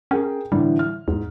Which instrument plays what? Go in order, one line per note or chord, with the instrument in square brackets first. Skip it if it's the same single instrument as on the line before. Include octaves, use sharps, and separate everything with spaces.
[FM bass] C#4 [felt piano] G#4 A#4 G5
[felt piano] A2 D3 E3 [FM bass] G3
[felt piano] F6
[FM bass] E2 [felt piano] G#2